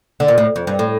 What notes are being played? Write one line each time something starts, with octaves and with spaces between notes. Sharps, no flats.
D3
A#2
A2
F2
G2
A2